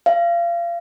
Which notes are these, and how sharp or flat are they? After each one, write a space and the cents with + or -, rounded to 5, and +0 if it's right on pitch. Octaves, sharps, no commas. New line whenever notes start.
F5 -30